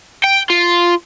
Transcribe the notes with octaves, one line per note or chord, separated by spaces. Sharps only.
G5
F4